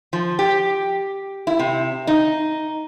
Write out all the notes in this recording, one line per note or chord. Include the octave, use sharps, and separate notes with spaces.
F3
G4
E4
C3
D#4